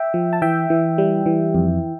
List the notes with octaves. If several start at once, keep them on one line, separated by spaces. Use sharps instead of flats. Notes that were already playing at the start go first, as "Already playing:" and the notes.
Already playing: E5 G5
F3
A5
E3 E5 G5
E3
G3
E3
F2